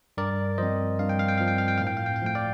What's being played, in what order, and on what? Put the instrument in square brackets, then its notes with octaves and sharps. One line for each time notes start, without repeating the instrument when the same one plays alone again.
[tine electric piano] G2 A#4 D5
F3 C4 C5 D#5
G2 F5
G5
F5
G5
F3 C4 F5
G5
F5
G5
A2 F5
G5
F5
G5
F5
F3 A3 G5
D5 F5